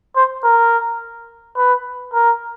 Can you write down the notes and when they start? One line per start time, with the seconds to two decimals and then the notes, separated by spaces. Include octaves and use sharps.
0.16 C5
0.44 A#4
1.57 B4
2.13 A#4